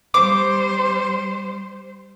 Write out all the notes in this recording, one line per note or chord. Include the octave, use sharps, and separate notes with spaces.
G3 C5 D6